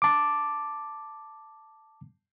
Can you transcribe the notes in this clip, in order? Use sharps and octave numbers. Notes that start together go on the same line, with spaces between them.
A5 D6